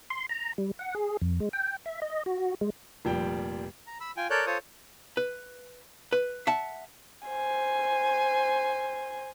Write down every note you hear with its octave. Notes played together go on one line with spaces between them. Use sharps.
C6
A#5
G3
F#5
G#4
F2
G#3
G5
E5
D#5
F#4
G#3
F1 A#2 F3 G3 G5
A#5
B5 E6
F4 G5 G#5
A4 A#4 C#5 D5 F#6 G6
F4 A4 C5 C#5 C#6 D#6
B4
B4
E5 F#5 A5
C5 G#5